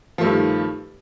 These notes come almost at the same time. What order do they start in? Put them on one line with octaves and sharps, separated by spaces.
F3 A3 G2 D#3